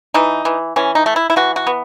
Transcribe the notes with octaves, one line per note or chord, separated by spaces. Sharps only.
E3 D#4
E3
E3 C#4
D#4
A3
E4
E4
E3 F#4
F#4
B3